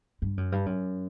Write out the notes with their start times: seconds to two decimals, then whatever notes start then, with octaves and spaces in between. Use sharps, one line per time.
0.22 G2
0.37 F#2
0.52 G2
0.66 F#2